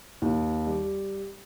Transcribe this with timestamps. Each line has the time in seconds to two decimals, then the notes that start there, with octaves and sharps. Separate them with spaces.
0.22 D#2
0.67 G3